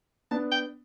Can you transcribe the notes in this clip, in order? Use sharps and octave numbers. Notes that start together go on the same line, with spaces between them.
B3 D4 A5
G5